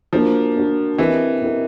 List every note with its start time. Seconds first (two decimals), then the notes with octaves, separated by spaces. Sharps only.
0.13 F3 A#3 D4 F#4
0.56 A#3 D4 F#4
0.98 E3 C4 E4 G4 A#4 D#5
1.42 C4 E4 G4 A#4 D#5